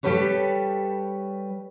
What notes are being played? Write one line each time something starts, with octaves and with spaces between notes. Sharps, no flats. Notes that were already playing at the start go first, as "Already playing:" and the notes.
G3 G4 A4 B4 C#5